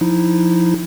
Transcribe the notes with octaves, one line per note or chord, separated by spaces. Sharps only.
F3 D#4 E4